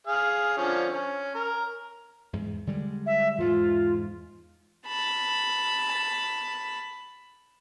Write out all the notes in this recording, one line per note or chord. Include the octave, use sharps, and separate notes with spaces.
G#4 F5
D3 F3 C#4
C#4
A#4
E2 G#2
D3 G3 G#3
E5
E2 G#2 G#3 F4
A5 B5